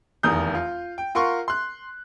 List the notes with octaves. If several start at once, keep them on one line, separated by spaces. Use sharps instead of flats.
F1 E2 D#3 A#5 D#6 G6
F4
G5
F4 A#4 F#5 C6 C#6
C6 F#6